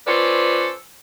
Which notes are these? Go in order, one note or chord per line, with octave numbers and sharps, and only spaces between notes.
C#4 F4 A4 B4 C5 D5